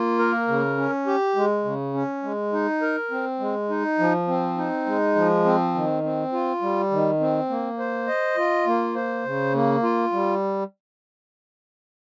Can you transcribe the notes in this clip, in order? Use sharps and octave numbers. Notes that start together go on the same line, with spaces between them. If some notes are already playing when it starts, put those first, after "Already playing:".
Already playing: A#3 F4
A#4
C#3
C#4
G4
G#3
C#3
C#4
G#3
D#4
A#4
C4
G#3
D#4
F3
C4
D#4
G#3
F3
C4
D#3
C4
F4
G3
D#3
C4
A#3
C5
D#5
F4
A#3
C5
C#3
A#3
F4
G3